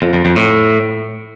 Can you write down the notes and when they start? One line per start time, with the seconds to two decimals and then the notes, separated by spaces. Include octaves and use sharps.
0.02 F2
0.13 F2
0.25 F2
0.36 A2